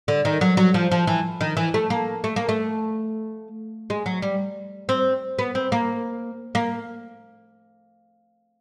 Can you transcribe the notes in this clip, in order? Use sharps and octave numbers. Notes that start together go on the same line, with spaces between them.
D3
D#3
F#3
F#3
F3
F3
E3
D#3
E3
A3
A#3
A3
A#3
A3
G#3
F#3
G3
C4
B3
C4
A#3
A#3